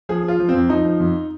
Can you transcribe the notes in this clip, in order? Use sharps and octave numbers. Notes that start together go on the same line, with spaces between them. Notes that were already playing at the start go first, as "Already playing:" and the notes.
F3 G#4
F3
F4
F3
C4
F2
F3 D#4
F3
F2